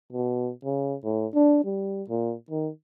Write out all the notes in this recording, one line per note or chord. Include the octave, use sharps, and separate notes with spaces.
B2
C#3
A2
D4
G3
A#2
D#3